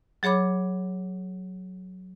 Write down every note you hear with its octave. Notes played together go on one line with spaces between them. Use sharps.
F#3 G#4 C#5 B5 D6